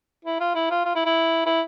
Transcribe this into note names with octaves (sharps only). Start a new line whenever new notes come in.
E4
F4
E4
F4
F4
E4
E4
E4